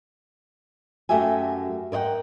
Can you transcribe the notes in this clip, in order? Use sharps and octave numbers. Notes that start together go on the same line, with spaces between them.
F#2 A3 F#4 G4 E5 G#5
A#4 C#5 D#5 F#5 G5